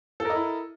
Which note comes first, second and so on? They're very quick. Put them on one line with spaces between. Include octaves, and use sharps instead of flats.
A4 A#4 D#5 E4